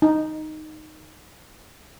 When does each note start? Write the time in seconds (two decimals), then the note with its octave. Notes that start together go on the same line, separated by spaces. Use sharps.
0.02 D#4